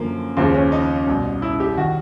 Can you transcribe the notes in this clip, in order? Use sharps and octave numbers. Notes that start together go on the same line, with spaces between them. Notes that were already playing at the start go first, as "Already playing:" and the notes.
Already playing: F#2 D3 F3 A#3
D#2 C#3 F3 C4
C#4
D#4
C2 B2
E4
G4
D#3 F#4